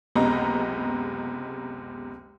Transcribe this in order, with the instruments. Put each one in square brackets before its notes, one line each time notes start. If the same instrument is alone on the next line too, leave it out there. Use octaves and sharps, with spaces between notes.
[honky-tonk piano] F#1 C#2 C3 B3 D#5 A#5